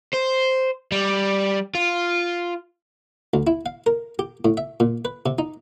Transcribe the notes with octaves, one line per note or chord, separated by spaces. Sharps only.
C5
G3
F4
D2
E4
F5
A#4
G4
A2
E5
A#2
B4
C3
D#4